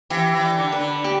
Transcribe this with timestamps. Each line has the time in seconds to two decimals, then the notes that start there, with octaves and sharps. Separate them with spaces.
0.10 E3 G4
0.33 E3
0.41 D5
0.57 D3
0.72 B4
0.80 D3
1.04 G4